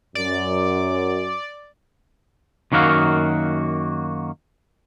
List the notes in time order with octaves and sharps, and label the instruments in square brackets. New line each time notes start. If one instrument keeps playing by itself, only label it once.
[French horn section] F#2 [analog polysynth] D5
[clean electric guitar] F#2 D#3 A#3 F#4 F5